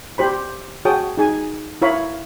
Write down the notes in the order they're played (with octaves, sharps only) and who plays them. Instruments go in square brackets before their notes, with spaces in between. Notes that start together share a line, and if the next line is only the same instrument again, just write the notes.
[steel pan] G4 C5 B5
F#4 G#4 C#5 G5 A5 D#6
D#4 G#4 G#5
E4 A#4 C#5 F5 B5